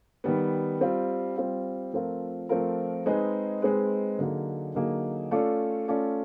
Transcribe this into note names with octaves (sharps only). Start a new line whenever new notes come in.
D#3 G3 B3
G3 C4 F4
G3 C4 F4
F3 A3 C4 F4 A#4
F3 A3 C4 F4 A#4
G#3 C4 D#4 G#4 B4
G#3 C4 D#4 G#4 B4
D3 F#3 A#3 D#4 G#4
D3 F#3 A#3 D#4 G#4
A3 C#4 F4 A4 D5
A3 C#4 F4 A4 D5